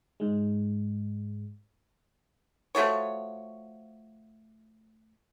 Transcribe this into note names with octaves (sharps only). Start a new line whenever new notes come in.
G#2 G#3
F3 A3 F#4 C#5